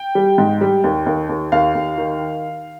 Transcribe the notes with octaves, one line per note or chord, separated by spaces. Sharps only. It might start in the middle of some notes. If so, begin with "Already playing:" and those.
Already playing: G5
G3
G#2
G3
D#2
D#2
D#2
D#2 F5
D#2
D#3